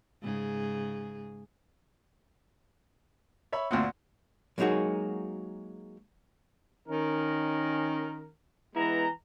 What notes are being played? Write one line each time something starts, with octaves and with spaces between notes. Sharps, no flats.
G#2 C#3 G#4
C#5 E5 B5
D2 A#2 C4 F#5
F#3 G#3 A#3 D#4 F#4 G#4
D#3 C#4 A#4
E3 G#3 B3 E4 A#5